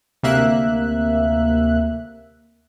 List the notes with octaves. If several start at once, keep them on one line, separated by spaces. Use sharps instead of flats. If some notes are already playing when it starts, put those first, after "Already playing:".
D2 C3 A#3 E5 F#6